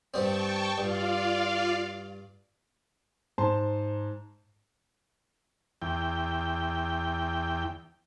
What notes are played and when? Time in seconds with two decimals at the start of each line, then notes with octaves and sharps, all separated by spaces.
0.14 G2 G3 C4 G5 A5 C#6
0.78 G2 F4 D5 F5
3.38 G#2 C5 A5 C6
5.82 E2 G5